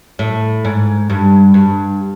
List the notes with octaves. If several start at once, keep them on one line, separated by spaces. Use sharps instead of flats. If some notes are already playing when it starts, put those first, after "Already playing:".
A2
G#2
G2
G2